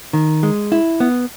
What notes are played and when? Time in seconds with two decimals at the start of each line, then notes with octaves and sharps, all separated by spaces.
0.13 D#3
0.43 G#3
0.72 E4
1.00 B3